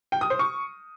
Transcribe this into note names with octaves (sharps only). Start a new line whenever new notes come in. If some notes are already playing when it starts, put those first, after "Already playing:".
G5
D#6
C5
C#6